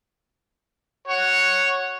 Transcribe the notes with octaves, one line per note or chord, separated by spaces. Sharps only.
F#4 C#5